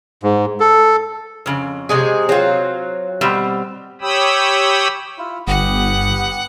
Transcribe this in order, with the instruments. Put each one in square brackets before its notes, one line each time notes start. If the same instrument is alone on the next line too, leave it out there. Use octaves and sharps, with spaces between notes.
[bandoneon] G#2
A4
[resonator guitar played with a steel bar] F2 C#3
[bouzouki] C3 G#3 G#4
[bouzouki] F#3 [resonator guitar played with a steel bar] C4 F4
[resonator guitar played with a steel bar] B2 G3 C4
[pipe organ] G4 C#5 G5 B5 D#6 E6
[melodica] E4 F4
[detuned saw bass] G1 [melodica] B3 G4 D#6 [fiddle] F#5